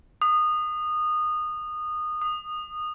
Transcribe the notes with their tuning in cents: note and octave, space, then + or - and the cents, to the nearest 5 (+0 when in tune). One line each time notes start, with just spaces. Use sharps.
D#6 -20
D#6 -15